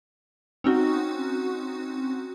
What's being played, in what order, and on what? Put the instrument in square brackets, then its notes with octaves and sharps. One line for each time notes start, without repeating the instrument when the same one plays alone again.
[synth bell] C4 C#4 D#4 F#4